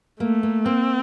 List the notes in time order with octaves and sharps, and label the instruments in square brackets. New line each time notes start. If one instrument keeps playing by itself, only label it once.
[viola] A3 [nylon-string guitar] A#3
[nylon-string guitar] A#3
[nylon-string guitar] A#3 [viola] C4